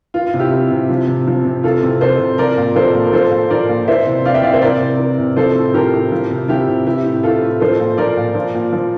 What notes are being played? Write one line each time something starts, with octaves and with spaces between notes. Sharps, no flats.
E3 F4
F4
C3
E4 G4
E3
C3
F3
C3
F3
C3
E3 F4 A4
C3
E3 A4 C5
C3
F3 A#4 D5
A#2
F3 A4 C5
A#2
A#4
F3 A4 C5
A#2
F3 A#4 D5
A#2
E3 C5 E5
C3
E3 D5 F5
E5 G5
C3 D5 F5
C5 E5
E3 A#4 D5
C3
E3
C3
F3 A4 C5
A2
F3 G4 A#4
A2
F3
C3
F3 E4 G4
C3
E3 E4 G4
A2
E3 F4 A4
A2
F3 A4 C5
A#2
F3 A#4 D5
A#2
F3
A#2
F3